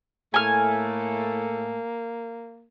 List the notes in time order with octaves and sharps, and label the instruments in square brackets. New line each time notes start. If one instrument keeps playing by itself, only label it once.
[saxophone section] A2 A3 [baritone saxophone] A#3 [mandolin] G#5 F6